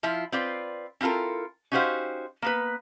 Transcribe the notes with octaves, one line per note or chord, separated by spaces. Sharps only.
F3 E4 F4
C4 F4 B4 D5
C4 E4 F4 A4 A#4
C#4 D#4 F#4 G4 C5 F5
A#3 B3 B4